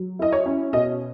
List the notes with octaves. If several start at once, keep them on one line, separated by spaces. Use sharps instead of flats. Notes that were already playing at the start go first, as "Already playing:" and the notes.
Already playing: F#3
E4 D#5
C#5
C#4
B2 D#5